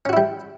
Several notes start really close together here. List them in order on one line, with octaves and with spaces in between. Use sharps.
C#4 F#4 E4 G3